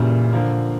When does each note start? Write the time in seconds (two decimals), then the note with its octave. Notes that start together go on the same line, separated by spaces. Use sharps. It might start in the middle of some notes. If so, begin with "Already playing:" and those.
Already playing: F#2 A#2 C#3 E3 G3
0.33 D3 F3 A#3